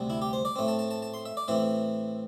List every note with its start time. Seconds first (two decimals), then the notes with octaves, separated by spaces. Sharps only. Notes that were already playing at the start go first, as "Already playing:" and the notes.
Already playing: D2 C3 G3 C4
0.10 E4
0.22 G4
0.33 C5
0.45 D5
0.56 A2 A3 C4
0.68 A5
0.79 A5
0.91 A5
1.02 A5
1.14 C6
1.26 E5
1.37 D5
1.48 A2 E3 C4 E5